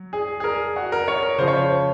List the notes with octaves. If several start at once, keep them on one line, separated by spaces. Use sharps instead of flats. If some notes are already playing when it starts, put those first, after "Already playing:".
Already playing: F#3
G#4
G#4
A#4
F#4
A#4
C#5
A#4
C#3 F3 C5
C#5
C5